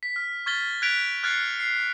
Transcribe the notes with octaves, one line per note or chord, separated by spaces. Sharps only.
B6
F6
C#6 F6 G#6 A6 B6 G7
F#6 G#6 B6 D7 F7
F6 F#6 G#6 A6 C7 C#7
C7